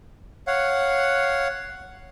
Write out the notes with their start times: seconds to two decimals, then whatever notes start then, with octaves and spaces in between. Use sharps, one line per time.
0.47 C#5 F5 F#5